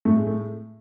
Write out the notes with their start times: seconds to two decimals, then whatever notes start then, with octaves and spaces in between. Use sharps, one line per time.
0.05 A2 A3
0.16 G#3
0.27 A3